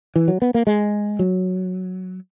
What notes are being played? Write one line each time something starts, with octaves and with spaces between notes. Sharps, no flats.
E3
F#3
B3
A#3
G#3
F#3